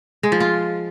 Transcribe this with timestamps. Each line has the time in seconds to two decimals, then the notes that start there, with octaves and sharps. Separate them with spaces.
0.23 G#3
0.32 F3
0.40 F4